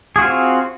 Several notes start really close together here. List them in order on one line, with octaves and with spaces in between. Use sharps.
G#4 F#4 F4 C4